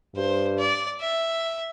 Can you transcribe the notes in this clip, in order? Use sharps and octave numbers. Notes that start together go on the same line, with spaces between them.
G2 C5
D5
E5